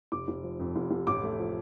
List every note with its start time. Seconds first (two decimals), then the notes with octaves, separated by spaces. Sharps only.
0.12 F1 D6
0.28 F1
0.43 F3
0.60 F2
0.76 F1
0.91 F1
1.07 A1 D6
1.23 A3
1.39 F3